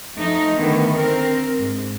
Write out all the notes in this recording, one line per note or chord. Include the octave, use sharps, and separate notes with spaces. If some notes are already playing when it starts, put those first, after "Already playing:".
F3 A3 D#4
D3 D#3 A3 B3
C4 A#4
G#2